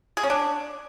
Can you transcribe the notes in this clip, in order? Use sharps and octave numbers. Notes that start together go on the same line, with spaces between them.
G#4
C#4
D4